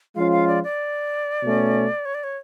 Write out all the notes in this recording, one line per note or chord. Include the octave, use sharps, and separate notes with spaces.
F3 G#3 C#4 F4 F5
F5
D5
D5
B2 A3 C#4
C#5
D5
C#5